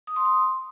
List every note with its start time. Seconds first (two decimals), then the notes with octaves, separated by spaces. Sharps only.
0.07 D#6
0.16 C6
0.25 D#6